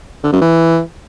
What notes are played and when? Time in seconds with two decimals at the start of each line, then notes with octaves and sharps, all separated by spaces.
0.24 D3
0.33 F#2
0.41 E3